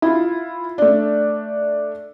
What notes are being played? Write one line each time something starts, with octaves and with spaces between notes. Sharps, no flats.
E4 F4
A3 D4